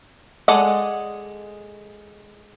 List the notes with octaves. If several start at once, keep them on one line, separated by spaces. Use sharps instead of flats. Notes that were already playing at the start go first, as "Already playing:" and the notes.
G#3 A4 D5 D#5 F#5